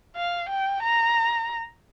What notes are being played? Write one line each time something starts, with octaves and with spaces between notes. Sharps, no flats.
F5
G5
A#5